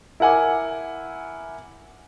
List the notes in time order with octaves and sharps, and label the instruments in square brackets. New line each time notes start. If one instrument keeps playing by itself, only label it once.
[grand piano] E4 A#4 F#5 G#5 D6